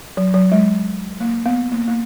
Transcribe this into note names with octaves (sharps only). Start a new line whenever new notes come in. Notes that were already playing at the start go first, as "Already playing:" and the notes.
F#3
F#3
G#3
A#3
B3
A#3
A#3